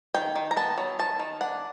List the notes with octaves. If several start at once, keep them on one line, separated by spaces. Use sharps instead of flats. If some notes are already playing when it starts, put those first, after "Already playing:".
D#3 G5
D#3
A#5
B3 A5
F#3
D#3 A5
D#3
D4 F#5